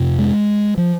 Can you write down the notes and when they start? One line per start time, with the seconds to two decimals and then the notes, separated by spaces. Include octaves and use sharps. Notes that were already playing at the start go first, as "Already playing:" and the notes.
Already playing: F2 C3
0.19 G#3
0.78 F3